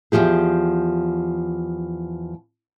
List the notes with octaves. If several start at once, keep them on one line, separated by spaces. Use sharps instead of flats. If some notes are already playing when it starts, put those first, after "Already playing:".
E2 C3 F3 G4 G#4